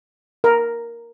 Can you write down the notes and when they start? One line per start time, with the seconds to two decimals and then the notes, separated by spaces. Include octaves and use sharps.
0.44 A#4